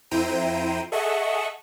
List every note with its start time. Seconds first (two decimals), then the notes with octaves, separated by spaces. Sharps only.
0.11 F2 E4 C5 G5 A#5 D#7
0.92 G#4 A4 D#5 E5 F#5 C#6